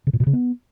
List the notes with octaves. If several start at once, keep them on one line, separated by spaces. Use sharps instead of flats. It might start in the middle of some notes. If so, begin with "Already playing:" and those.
C#3
A#2
B2
C#3
B3